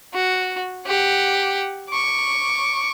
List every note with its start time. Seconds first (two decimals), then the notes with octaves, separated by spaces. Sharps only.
0.14 F#4
0.86 G4 F#5
1.89 C#6 D6